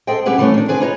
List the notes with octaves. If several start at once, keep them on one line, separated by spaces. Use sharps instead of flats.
G#4 A4 C5 D#5 G5
G3 C#4 G4 G#4 B4 F#5
C#3 E3 A3 C#4 C#5
D#3 D4
D4 G#4 B4 C5 G#5
D#4 F4 B4 C#5 D#5